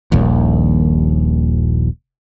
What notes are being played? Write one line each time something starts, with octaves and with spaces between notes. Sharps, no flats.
D#1 A#1 D#2